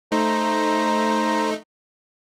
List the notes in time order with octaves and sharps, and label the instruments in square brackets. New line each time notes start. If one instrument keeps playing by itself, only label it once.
[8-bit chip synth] A3 D#4 [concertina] C5 A#5